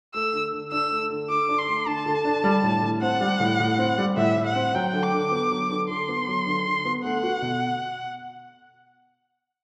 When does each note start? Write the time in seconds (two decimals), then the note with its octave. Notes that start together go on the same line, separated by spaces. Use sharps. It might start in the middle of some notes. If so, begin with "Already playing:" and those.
0.14 A3 E6
0.33 D3
0.52 D3
0.72 D4 E6
0.91 A3
1.10 D3
1.29 D3 D6
1.49 D4
1.58 C6
1.68 A3
1.86 D3 A5
2.06 D3
2.25 D4
2.44 G3
2.63 A2
2.82 A2
3.01 C4 F#5
3.21 G3
3.40 A2
3.60 A2
3.78 C4
3.98 G3
4.17 A2 E5
4.36 A2
4.46 F#5
4.55 C4
4.75 F#3 G5
4.93 D3
5.03 D6
5.13 D3
5.31 B3
5.51 F#3
5.70 D3
5.89 D3 C6
6.09 B3
6.28 F#3
6.47 D3
6.66 D3
6.85 B3
7.04 A3 F#5
7.23 F#4
7.42 B2